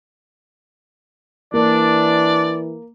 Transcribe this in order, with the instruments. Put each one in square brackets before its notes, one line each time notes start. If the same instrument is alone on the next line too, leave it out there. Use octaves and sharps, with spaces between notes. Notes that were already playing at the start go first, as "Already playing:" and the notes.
[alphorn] E3 [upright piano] A#3 [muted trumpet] D4 [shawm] D5